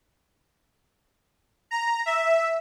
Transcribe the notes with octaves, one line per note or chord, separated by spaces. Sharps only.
A#5
E5